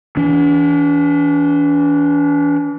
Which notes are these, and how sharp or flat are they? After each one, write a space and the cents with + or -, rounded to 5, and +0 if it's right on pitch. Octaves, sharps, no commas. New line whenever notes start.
E3 +0 D4 -40